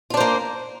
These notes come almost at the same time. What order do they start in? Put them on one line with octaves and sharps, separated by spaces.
F4 D4 C5 A#3